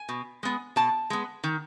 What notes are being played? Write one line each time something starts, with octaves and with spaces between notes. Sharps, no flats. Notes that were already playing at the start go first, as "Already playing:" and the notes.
Already playing: G#5
B2
G#3 B3
B2 A5
G#3 B3
D#3